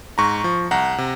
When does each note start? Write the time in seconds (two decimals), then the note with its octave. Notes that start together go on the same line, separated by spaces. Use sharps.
0.18 G#2 A#5 C#6
0.44 F3
0.71 C2 F#5 A#5
0.98 C3